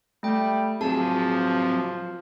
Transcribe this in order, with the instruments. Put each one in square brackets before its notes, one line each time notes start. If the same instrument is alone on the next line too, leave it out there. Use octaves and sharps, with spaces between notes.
[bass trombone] G3 [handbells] A3 G5
[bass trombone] F3 [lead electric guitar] F#3 C4 [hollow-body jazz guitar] G#4 [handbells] A5